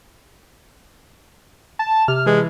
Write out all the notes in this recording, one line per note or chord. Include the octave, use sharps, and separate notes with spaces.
A5
C3 F6
E3 G#3